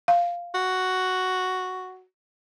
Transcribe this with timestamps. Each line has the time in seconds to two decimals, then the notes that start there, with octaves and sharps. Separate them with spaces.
0.08 F5
0.54 F#4